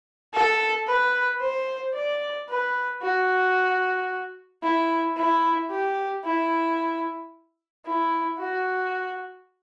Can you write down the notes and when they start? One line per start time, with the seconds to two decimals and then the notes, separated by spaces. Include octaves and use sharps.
0.33 A4
0.87 B4
1.40 C5
1.95 D5
2.49 B4
3.02 F#4
4.63 E4
5.17 E4
5.70 G4
6.24 E4
7.86 E4
8.39 F#4